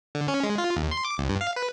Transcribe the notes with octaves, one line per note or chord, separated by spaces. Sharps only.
D3
C#4
G#3
F4
D#2
C6
D6
C#2
G2
F5
B4